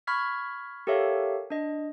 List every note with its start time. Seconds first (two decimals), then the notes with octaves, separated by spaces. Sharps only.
0.07 B5 C#6 F6 G#6 B6
0.87 G4 A4 A#4 C#5 E5 F5
1.50 D4 D#5